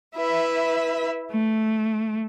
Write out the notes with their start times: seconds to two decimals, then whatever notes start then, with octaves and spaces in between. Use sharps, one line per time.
0.16 E4 B4 E5
1.31 A3